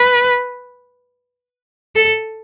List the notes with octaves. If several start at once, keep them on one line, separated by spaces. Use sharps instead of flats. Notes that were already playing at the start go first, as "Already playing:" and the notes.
Already playing: B4
A4